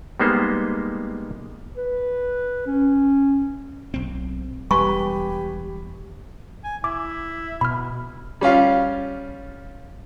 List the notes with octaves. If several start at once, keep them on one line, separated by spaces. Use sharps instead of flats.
G3 G#3 A#3 B3 D#4 C5
B4
C#4
B1 C4
E1 G3 G4 B4 G#5 B5 C#6
G#5
E4 D6
B2 B5 F6
G3 C#4 F4 F5